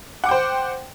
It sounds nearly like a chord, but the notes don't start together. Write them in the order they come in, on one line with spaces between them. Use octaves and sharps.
F#5 D6 G5 C5